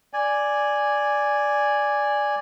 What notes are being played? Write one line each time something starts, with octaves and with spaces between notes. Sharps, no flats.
D5 G#5